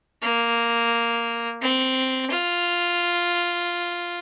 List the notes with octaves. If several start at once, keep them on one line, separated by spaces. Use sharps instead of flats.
A#3
C4
F4